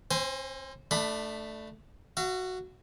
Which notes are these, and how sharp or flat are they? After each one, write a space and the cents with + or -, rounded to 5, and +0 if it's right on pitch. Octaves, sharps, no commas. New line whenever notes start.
C4 +40 C5 -15 G#5 +0
A3 +0 D4 +25 B5 +10
F#4 +0 F5 -45